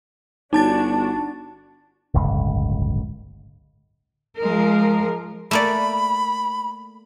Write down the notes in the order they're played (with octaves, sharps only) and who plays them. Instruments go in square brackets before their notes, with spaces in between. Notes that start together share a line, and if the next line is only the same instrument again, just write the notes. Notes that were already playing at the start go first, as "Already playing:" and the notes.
[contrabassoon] G1 [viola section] D4 F#4 [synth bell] D#4 A5 A6
[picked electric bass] D1 G1 C#2
[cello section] F3 G#3 A#4
[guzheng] A3 A#3 D5 [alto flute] B5